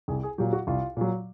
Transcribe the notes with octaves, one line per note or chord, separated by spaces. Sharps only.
C2 G#4
G#4
A#2 F#3 G4
F#4
C2 F4
A#2 F#3